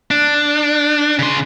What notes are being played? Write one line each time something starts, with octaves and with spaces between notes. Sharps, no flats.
D4
C#3 C6